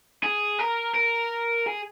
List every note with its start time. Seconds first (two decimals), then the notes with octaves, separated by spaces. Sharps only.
0.23 G#4
0.59 A#4
0.95 A#4
1.67 G#4